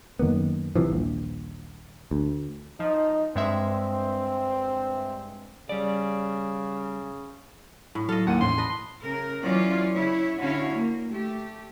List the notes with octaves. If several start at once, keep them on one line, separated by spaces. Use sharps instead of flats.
F#2 D#3 A#3 B3
C2 C3 E3 F3
D#1 A#1
D2
F3 D#4
G2 G#3 C4 E5
C#3 G3 D5
A2
F#3 A4 D#5 F5 C#6
D#2 A#3 F#5 D#7
E2 A2 C#4 E4 C6
B4 D#5 A5
C#3 A#4
E3 F#3 C#4 F4 D5
C#3 E4 C#5
D3 C#4 E4 F#4 C#5 F5
A#3
A3 G4